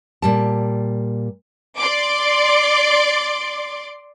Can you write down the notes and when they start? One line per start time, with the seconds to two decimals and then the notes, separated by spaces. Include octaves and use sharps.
0.22 A#2 G3 A5
1.78 D5 C6 D6